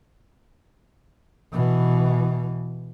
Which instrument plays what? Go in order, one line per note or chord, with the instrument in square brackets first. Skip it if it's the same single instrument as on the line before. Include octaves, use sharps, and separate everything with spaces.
[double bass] B2 E3